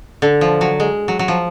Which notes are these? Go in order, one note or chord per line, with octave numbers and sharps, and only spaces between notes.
D3
F3
F#3
G#3
F#3
F#3
F3